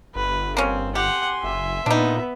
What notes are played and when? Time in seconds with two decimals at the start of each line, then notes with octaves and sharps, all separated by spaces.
0.15 G1 B4
0.57 A#3 C4 C#4
0.95 G4 F#5 G#5 C6
1.43 F#1 E5
1.86 A#2 B3 D4 D#4